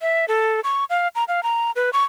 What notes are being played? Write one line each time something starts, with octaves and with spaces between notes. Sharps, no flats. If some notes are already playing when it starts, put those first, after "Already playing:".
E5
A4
C#6
F5
A#5
F5
A#5
B4
C#6